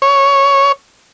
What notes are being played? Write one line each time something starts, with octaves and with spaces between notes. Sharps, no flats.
C#5